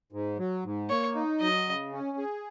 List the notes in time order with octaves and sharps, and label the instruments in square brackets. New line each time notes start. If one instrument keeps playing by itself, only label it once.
[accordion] G#2
F#3
G#2
[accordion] A#3 [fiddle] C#5
[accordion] D#4
[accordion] F#3 [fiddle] D#5
[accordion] C#3
C#4
G#4